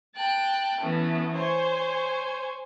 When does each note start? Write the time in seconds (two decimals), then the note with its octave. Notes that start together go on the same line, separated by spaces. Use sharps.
0.15 G5 A5 F#6
0.81 E3 A3 B3 C#4
1.34 C5 C#5 G#5